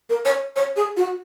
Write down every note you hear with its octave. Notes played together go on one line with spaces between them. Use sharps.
A#4
C#5
C#5
G#4
F#4